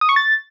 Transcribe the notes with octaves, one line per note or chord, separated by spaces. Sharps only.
D#6
C#6
A6